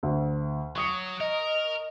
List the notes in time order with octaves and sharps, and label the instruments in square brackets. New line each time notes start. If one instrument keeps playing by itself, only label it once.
[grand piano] D2
[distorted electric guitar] F#3 [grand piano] C#6 D#6 C#7
[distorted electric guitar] A#4 [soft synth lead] D#5